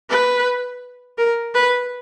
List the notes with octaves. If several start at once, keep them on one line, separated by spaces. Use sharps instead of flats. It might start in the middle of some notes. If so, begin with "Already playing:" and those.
B4
A#4
B4